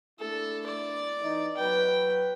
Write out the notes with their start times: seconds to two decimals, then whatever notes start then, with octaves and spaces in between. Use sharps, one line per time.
0.20 A3 D4 E4 A4
0.66 D5
1.21 E3 D#4
1.57 F#3 B4 G5